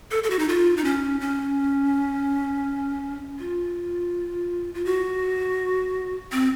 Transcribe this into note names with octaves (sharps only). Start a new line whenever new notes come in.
A4
A4
F#4
D#4
F4
D#4
C#4
C#4
F4
F4
F#4
C4